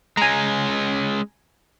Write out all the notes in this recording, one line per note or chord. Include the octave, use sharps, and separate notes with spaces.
G#3 C#4 G#5 A#5